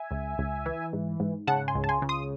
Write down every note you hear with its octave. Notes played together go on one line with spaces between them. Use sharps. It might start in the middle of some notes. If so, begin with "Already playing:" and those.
Already playing: E5 G#5
C#2
C#2
E3
G#2
G#2
C#3 F#5 A5
G#5 C6
C#2
A5
G#5 C6
C#3
C6 D#6